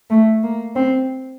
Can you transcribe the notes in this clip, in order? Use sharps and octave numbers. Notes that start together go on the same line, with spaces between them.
A3
A#3
C4